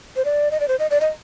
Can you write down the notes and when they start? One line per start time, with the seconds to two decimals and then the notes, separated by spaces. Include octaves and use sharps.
0.16 C5
0.25 D5
0.51 D#5
0.60 D5
0.68 C5
0.79 D#5
0.91 D5
1.01 D#5